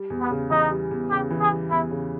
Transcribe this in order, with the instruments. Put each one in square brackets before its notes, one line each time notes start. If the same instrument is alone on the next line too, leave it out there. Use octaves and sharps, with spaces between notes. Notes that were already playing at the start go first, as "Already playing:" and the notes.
Already playing: [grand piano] G3
E2
[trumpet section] B3
[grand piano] C#3
[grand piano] E3 [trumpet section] D#4
[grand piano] G3
E2
[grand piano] C#3 [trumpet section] G4
[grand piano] E3
[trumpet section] G#4
[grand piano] G3
[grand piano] E2 [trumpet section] E4
[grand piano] C#3